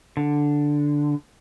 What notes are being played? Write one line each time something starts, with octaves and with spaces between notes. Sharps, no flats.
D3